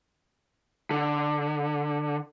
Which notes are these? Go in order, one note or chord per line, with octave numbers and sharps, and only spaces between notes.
D3